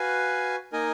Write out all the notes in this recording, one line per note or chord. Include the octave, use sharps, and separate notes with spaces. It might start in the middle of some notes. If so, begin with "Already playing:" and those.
Already playing: F#4 B4 F5 G#5
A#3 D#4 A#4 D#5 G#5